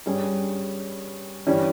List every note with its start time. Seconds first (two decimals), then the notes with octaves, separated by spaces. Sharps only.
0.06 G2 G3 C#4 G#4
1.47 G2 E3 G3 C#4